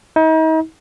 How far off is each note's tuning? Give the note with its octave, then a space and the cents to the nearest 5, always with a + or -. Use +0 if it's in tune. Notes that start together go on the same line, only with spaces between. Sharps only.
D#4 +40